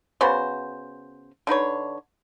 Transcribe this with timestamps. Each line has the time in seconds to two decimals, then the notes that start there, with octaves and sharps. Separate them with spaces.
0.21 C#3 B3 F#4 C5
1.47 D3 D#4 B4 C#5